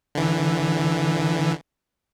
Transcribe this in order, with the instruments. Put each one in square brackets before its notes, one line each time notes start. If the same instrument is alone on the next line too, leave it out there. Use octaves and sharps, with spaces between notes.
[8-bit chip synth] D3 E3